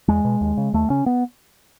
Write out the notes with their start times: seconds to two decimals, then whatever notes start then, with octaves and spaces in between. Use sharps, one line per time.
0.08 E2 G#3
0.25 B2
0.41 D#2
0.57 C#3
0.74 D#2 A3
0.90 C#3 C#4
1.06 B3